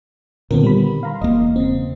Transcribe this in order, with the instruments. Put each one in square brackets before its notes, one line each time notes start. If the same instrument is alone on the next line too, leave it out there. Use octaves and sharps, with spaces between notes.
[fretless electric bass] A#2 D3 D#3 [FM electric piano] B3 C4 A#4
[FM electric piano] G3 B5
F5 A#5 C6
[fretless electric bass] E1 E2 A#3 [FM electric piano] D#5
[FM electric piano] C#3 C4